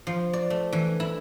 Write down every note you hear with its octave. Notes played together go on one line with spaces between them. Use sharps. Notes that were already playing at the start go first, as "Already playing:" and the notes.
F3
D5
A3
E3
E4